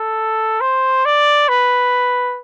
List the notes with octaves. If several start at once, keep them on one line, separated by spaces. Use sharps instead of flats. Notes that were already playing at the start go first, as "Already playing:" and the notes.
Already playing: A4
C5
D5
B4